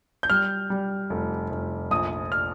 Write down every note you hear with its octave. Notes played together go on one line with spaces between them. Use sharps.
G6
G3 F6
G3
F1
F1
A#1 D#6
F6